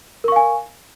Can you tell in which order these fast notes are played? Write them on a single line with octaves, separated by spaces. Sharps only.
A#4 C#6 F5 G#5